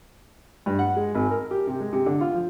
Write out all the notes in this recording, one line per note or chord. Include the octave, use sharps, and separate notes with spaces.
G2
F#5
G#3
G#1
A#4
G4
C3
G#3
C3
D3
F4
F3